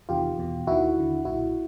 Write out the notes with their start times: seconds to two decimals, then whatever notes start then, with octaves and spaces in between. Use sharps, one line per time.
0.09 E2 C3 D#3 F4 G4
0.38 E2 B2
0.67 D#2 D#3 E4 F#4
0.97 D#2 D3
1.25 B1 A#2 E4 F#4